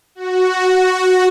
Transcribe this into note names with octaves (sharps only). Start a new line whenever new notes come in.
F#4